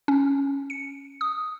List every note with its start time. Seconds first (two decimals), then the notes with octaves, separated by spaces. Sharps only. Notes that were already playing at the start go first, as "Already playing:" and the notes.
0.08 C#4
0.70 C#7
1.21 D#6